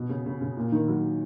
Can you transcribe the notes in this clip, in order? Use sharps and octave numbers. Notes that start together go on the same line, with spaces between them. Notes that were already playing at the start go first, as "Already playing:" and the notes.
Already playing: B2
C#3
C#3
C#3
A#2
D#3
F#3